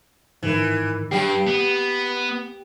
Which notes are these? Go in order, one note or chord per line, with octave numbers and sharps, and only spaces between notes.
G#2 D#3 E3
G2 G4 C7
B3